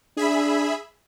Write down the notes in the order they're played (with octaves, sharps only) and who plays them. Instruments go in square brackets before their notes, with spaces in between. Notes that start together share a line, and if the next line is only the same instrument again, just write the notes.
[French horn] D4 [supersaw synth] G#4 E5 B5